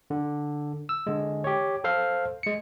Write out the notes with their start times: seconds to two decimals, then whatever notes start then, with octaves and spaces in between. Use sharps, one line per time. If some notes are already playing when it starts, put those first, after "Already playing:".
0.10 D3
0.89 E6
1.07 D3 G#3
1.44 G4 C#5
1.84 A4 C5 F5 C6
2.43 G#3 C#7